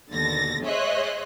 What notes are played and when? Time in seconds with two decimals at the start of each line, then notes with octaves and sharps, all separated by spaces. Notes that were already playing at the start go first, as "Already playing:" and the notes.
0.10 D#2 B2 D3 A6 A#6
0.64 G#4 C5 C#5 D#5 E5 F#6